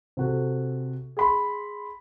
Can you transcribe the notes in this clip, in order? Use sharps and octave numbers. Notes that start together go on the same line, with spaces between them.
C3 F#4 A4
G#4 B5 C6